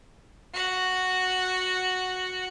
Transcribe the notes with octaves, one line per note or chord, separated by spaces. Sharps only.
F#4 F#5